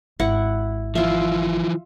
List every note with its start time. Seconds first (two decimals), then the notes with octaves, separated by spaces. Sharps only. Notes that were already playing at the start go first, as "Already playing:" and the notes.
0.20 G#1 E4 F#5
0.95 E3 F3 F4 E5